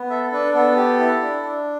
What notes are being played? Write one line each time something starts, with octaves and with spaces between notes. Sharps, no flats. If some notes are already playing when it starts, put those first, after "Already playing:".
Already playing: B3
A4 E5
D4 B4
B3 A4
G4
E4
D4
D4